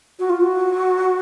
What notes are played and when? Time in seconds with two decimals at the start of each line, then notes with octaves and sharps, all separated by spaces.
0.19 F#4
0.30 F4
0.40 F#4